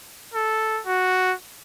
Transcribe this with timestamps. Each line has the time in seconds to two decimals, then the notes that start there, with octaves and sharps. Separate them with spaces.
0.34 A4
0.86 F#4